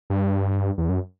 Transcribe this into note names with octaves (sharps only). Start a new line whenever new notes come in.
G2
E2
F#2